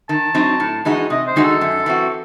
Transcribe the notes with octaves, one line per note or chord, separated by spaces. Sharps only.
D#3 A5
F#3 C4 D#4
A2
E3 G#3 D#4 F#4
C3 D#5
C5
D#3 G#3 D#4 F#4
A4
F#2
E3 C4 F#4